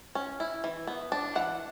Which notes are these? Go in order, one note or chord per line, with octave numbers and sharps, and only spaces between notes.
C#4
E4
E3
B3
D4
E3 F#5